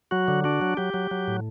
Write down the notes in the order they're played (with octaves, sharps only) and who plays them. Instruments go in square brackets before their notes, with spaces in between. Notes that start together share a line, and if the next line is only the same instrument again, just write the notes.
[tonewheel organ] F#3 F#4
D3
D4 F#4
F#3
F#3 G4
F#3
F#3
A2